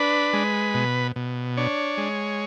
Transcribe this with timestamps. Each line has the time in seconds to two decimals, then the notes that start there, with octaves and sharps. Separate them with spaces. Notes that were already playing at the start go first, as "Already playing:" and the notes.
Already playing: D4 B4
0.33 G#3
0.74 B2
1.16 B2
1.57 D4 C#5
1.97 G#3